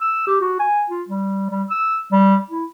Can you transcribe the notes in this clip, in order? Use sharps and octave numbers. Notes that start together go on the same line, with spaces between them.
E6
G4
F#4
G#5
F4
G3
G3
E6
G3
E4